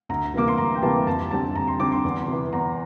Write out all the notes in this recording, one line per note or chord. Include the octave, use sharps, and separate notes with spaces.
D2 A#5
C3 E3 G3 A#3 D6
C6
D2 A#5
G5
C3 E3 G3 A#3 A5
F2 A5
D3 G3 C4 A5
F2 A#5
C6
D3 G3 C4 D6
C6
E2
C3 E3
E2 A#5